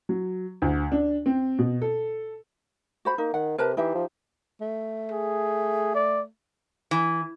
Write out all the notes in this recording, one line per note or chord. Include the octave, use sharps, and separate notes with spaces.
F#3
D2
D4
C4
B2
A4
F#4 C5 B5
A#3 D#4
D#3 F#5
C3 A#4 B4 A5
E3 D#4 G4 E5
F3
A3
G#4
D5
E3